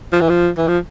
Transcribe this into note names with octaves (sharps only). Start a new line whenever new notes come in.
F3
E3
F3
E3
F3